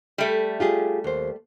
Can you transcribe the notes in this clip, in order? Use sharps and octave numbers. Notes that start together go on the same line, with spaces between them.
G3 A3
F4 G4 G#4
D#2 C5